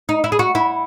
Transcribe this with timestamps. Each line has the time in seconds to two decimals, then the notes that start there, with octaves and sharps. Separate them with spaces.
0.09 D#4
0.24 E4
0.32 G#4
0.39 F#4
0.55 E4